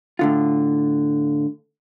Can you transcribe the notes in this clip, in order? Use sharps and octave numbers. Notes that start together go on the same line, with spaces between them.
A2 D3 F4